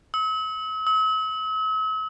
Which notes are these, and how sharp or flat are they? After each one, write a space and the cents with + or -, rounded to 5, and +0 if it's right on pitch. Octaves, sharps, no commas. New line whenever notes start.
E6 -45
E6 -45